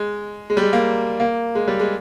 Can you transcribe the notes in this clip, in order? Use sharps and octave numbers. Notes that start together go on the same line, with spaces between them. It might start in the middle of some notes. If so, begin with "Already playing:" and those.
Already playing: G#3
G#3
G3
G#3
A#3
A#3
G#3
G3
G#3